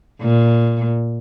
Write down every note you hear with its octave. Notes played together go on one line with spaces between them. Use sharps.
A#2